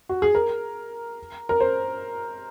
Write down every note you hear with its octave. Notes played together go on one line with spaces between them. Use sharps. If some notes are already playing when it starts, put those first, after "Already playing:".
F#4
G#4
A#4
A#4
C5